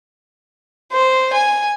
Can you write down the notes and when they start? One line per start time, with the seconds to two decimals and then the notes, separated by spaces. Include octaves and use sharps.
0.92 C5
1.33 G#5